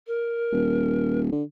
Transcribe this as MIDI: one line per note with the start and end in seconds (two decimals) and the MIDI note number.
0.07 1.20 70
0.52 1.28 27
1.32 1.43 50